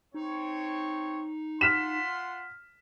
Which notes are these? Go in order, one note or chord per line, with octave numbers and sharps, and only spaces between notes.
C4 D#4 C#5
F4 F#5 C6 F6 B6 E7